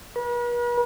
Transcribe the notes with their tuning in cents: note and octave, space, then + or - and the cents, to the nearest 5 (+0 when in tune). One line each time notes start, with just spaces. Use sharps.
B4 -45